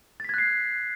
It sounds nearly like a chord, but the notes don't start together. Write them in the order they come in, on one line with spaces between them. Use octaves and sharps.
A6 B6 G#6 F#6 C7